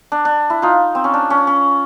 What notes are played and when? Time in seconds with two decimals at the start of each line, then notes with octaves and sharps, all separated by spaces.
0.12 D4
0.25 D4
0.50 E4
0.62 D#4 F4
0.95 C4
1.04 C#4
1.14 D4
1.30 C#4
1.47 C#4